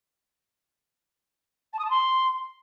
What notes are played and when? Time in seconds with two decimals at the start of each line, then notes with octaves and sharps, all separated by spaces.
1.73 A5
1.79 D#6
1.84 A5
1.90 C6